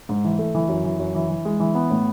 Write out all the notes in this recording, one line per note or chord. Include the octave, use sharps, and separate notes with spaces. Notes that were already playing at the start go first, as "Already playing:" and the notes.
G#2
E3
A3
E3
F#2
E3
F#2
E3
E3
G#3
E3
B3
A2